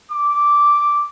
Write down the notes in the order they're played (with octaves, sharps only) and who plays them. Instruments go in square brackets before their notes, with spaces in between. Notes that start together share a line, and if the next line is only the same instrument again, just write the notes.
[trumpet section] D6